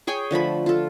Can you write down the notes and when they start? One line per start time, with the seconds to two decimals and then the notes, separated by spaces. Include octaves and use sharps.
0.07 G#4 C#5 G5 G#5
0.31 D3 F3 A3 B5
0.66 F4 A4